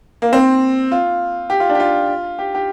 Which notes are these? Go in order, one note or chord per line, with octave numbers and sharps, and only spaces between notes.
A#3
C4
F4
G4
F4
D4
G4
F4
G4
G4